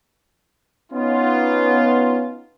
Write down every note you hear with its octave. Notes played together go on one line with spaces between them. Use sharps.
B3 C#4 D#4 F4